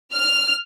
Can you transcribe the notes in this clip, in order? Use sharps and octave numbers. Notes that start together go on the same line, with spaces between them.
F6